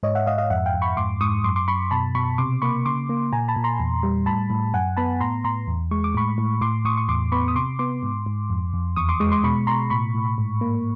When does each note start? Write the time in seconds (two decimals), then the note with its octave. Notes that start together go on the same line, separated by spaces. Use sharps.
0.03 G#2 C#5 D#5
0.15 E5 F#5
0.26 G#2 D#5 F5
0.38 D#5 F5
0.50 F2 E5 F#5
0.66 F5 G5
0.74 F2
0.82 B5 C#6
0.97 G#2 C6 D6
1.21 G#2 C#6 D#6
1.44 F#2 C6 D6
1.56 C6 D6
1.68 F#2 B5 C#6
1.91 B2 A5 B5
2.15 B2 B5 C#6
2.38 C3 C6 D6
2.62 A#3 B5 C#6
2.86 C#3 C6 D6
3.09 A#3
3.32 A#2 G#5 A#5
3.48 A5 B5
3.56 A#2
3.64 A#5 C6
3.80 E2
4.03 G3
4.26 A2 A5 B5
4.50 A2
4.74 F#2 F#5 G#5
4.97 B3 A5 B5
5.20 A2 A#5 C6
5.44 A2 A#5 C6
5.67 E2
5.91 G#3 C#6
6.04 D6
6.14 A2 B5 C#6
6.38 A2
6.61 A2 C6 D6
6.85 A2 C#6 D#6
6.97 C#6
7.09 E2 C6 D6
7.32 B3 B5 C#6
7.48 D#6
7.55 C3 C6 D6
7.79 B3 C6 D6
8.03 G#2
8.26 G#2
8.50 F2
8.73 F2
8.96 E2 C#6 D#6
9.09 C6 D6
9.20 G#3 C#6 D#6
9.32 C6 D6
9.44 B2 B5 C#6
9.67 B2 A#5 C6
9.90 A2 B5 C#6
10.14 A2
10.38 G#2
10.61 A#3